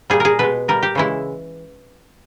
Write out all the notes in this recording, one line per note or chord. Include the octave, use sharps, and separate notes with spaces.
A#2 G3 G#4
G#4 A#4
B2 G#3 B4
A#2 G3 A#4
G4
C#3 E3 G#3 E4